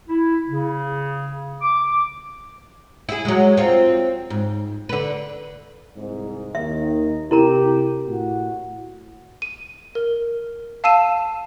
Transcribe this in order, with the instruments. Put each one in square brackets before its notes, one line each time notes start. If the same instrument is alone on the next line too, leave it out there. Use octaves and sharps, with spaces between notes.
[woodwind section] E4
C#3
D6
[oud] E4 G#4
F#3 G#3
C4 F4
G#2
D3 B4
[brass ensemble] C2 G#2
[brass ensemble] D#2 D#3 [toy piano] E5
[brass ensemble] C3 G4 [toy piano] E4 A#4 A#5
[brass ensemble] A2 F#4
[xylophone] D#7
A#4
F5 A5 E6 C7 D#7 E7